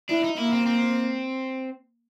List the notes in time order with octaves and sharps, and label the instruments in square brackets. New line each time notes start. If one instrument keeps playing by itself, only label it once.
[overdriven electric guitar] D4 [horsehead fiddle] E4
[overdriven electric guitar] D#4
[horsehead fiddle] A#3 [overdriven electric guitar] E4
[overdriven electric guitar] C4
C4